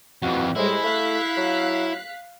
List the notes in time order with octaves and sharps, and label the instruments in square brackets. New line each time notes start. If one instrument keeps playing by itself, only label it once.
[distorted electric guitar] F2 E3 [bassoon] F#4
[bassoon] A2 [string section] G3 G#3 C5 [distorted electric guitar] E4
[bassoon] A3 [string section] F5 F#6 B6
[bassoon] F#3